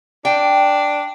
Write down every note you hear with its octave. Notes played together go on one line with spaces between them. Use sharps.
D4 G5